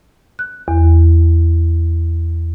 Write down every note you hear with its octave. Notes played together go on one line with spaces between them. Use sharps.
F#6
E2